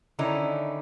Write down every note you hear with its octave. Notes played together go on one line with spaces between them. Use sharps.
D3 D#3 C#4 D#4 E4